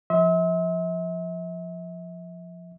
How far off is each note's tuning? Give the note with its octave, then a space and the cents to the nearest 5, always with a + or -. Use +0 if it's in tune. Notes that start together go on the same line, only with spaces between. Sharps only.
F3 +0 E5 -40 C6 +0